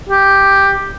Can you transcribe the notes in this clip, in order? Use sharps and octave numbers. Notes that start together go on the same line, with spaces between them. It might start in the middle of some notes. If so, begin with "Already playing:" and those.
G4